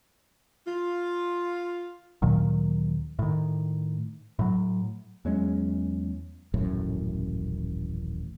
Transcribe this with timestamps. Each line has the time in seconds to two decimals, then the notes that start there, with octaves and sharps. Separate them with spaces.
0.66 F4
2.22 D2 A#2 D#3 F#3
3.19 A2 D#3
4.39 A2 F#3
5.25 E2 F#3 G#3 C#4
6.54 D#1 A1 F#2 A2